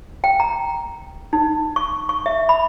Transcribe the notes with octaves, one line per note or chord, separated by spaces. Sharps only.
G5
A#5
D#4
C#6
C#6
E5
B5